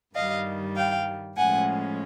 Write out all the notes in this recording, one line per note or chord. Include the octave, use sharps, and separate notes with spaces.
G2 D#3 G3 D#5 F5
F5 G5
A2 F3 G#3 C#4 F#5 G#5